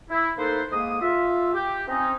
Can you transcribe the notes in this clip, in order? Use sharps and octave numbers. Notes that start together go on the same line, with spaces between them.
E4
A3 A#3 D#4 A4 B4 C5
G#2 A#3 D#6
F4 E5
G4
C4 C#4 D#4